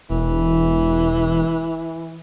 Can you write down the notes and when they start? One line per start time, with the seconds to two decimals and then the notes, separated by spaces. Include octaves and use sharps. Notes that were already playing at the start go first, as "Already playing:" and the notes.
0.10 E1 E3